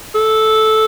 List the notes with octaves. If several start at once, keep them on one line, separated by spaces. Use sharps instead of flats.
A4